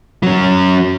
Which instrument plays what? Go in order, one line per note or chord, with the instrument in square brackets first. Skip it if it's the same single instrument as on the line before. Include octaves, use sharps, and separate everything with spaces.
[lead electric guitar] F#3 C#4